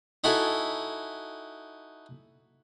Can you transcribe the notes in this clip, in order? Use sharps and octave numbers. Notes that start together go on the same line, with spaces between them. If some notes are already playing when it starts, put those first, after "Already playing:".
D#4 E4 F#4 A4 G#5